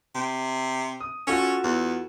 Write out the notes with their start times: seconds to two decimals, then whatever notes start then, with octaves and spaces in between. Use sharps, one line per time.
0.15 C3
1.00 D#6
1.27 C#4 F4 F#4 A4
1.64 E2